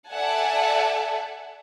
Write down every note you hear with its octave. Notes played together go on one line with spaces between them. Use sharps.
A4 D5 E5 F#5 G#5 A5